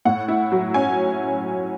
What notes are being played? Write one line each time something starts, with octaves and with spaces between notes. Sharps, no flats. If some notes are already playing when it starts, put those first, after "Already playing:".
A2 F#5
E4
F#3
C#4 G#5